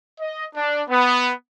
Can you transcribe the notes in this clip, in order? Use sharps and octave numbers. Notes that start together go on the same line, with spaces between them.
D#5
D4
B3